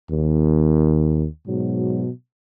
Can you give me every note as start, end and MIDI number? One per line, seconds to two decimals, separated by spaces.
0.10 1.26 39
1.47 2.09 44
1.47 2.09 47
1.47 2.09 54